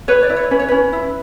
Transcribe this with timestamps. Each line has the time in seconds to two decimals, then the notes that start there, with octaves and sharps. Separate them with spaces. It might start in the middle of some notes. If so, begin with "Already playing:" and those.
0.08 B4 C#5
0.23 D5
0.30 E4
0.36 C#5
0.51 C#4 B4
0.59 C#5
0.68 C#4 B4
0.93 E4